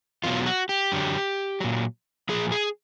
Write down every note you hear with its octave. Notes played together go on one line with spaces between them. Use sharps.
E2 B2 F#3 F4
F#4
G4
F#2 D3 F#3
A#2 F#3
A#2 F3 G#4
G#4